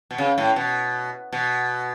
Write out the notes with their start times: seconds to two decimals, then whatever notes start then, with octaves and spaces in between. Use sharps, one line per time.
0.11 B2
0.18 C#3
0.38 A2
0.56 B2
1.32 B2